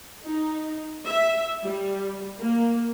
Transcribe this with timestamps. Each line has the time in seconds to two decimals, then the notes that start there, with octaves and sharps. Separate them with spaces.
0.24 D#4
1.07 E5
1.64 G3
2.40 A#3